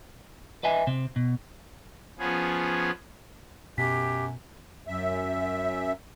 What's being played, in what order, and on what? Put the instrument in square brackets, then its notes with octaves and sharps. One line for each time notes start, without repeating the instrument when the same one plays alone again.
[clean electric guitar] B4 D#5 E5 G#5
C3 C4
B2
[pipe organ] F3 B3 C#4 G#4
[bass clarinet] F#2 [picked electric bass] B2 [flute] G4 [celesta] B6
[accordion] F#2 E5